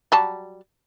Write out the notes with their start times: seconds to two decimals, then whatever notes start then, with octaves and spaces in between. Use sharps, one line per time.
0.12 F#3 G3 A5